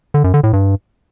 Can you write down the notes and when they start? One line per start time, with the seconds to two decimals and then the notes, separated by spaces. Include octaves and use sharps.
0.14 D3
0.24 F#2
0.34 D3
0.44 A2
0.53 G2